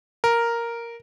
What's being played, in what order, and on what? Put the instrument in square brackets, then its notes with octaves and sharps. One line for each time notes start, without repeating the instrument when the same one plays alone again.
[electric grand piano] A#4